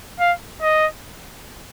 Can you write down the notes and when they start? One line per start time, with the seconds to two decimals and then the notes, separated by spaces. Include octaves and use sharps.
0.20 F5
0.62 D#5